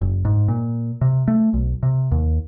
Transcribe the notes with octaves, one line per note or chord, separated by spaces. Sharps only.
F#1
G#2
A#2
C3
A3
B1
C3
D#2